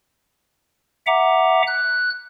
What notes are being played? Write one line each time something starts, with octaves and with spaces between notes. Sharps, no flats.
E5 F#5 A#5 D6
F#6